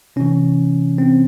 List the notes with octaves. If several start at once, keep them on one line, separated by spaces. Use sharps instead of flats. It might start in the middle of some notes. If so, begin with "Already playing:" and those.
C3 E3 C#4
C4